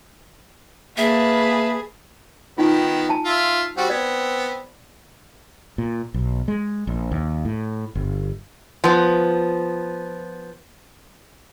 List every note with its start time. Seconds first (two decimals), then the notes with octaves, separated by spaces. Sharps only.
0.97 A#3 G#4 B4 E5 A5
2.58 D#3 B3 D#4 F4 G5
3.09 G#5 A5
3.26 F4 E5
3.77 G3 C4 F#4
3.90 B3 C4 D5
5.78 A#2
6.14 B1
6.48 G#3
6.87 A#1
7.11 D#2
7.45 A2
7.95 G1
8.84 F3 B3